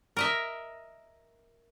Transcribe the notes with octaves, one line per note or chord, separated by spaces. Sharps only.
A#4 D#5 E5